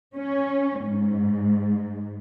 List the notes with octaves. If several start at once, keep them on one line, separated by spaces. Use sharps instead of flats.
C#4
G#2